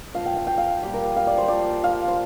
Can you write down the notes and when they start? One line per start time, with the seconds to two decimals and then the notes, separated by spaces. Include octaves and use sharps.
0.15 A#2 F3 F5
0.26 G5
0.36 F5
0.47 G5
0.58 F5
0.82 A#2 G3 G4
0.94 A#4
1.16 F5
1.27 D5
1.38 C5
1.48 A#2 F3 D5
1.84 F5
2.08 C5